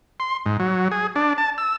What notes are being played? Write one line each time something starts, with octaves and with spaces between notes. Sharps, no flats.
C6
G#2
F#3
G#4
D4
A5
E6